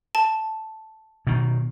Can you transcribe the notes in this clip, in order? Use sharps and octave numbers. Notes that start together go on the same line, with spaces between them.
A5
B2 D#3